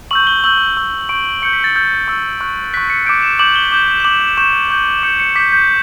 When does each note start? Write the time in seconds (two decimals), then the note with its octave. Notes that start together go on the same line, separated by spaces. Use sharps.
0.11 C#6 E6 G6 F#7
0.27 G7
0.44 C#6 E6 G6 F#7
0.77 C#6 E6 G6
1.09 C#6 G6 D7
1.42 C#6 G6 C#7
1.53 B6
1.64 A6
1.75 C#6 E6 G6
2.08 C#6 E6 G6
2.41 C#6 F#6
2.74 C#6 F#6 B6
2.90 C#7
3.06 D6 G6 D7
3.22 E7
3.39 D6 G6 F#7
3.56 G7
3.72 D6 G6
4.00 E7
4.05 D6 G6 F#7
4.21 E7
4.37 C#6 G6 E7
4.70 C#6 G6
5.03 D6 G6 C#7
5.20 C#7
5.35 D6 G6 B6
5.52 G6